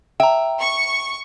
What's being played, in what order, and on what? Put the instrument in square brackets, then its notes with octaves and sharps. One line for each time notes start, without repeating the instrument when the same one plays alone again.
[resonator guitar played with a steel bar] E5 [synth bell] G5 A#5
[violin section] C#6